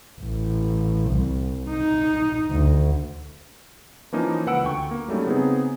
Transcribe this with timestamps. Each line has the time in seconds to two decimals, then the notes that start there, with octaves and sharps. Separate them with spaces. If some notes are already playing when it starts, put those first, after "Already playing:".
0.21 A1
1.11 C2
1.70 D#4
2.51 D2
4.12 E3 F3 A#3 C#4 D#4
4.46 C#2 B4 F#5 E6 D7
4.64 D2 G5 C#6
4.91 A#3
5.08 F#3 G3 A3 C#4 D#4
5.26 C#3 B3 C4 D#4 G#4